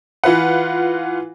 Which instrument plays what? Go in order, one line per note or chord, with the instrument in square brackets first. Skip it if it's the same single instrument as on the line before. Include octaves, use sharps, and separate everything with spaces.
[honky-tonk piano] E3 F4 B4 F#5